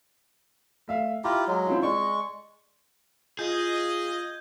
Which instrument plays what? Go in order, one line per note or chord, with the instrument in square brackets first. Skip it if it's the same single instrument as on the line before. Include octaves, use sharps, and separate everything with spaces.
[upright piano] A3 E5 F5
[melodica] E4 F4 G4 [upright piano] A#5
[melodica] F#3 G#3
[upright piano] C4 E4 F4
[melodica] G#3 C#6 [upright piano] D5
[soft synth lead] F4 [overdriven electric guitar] G#4 [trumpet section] D#5 [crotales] G6 G#6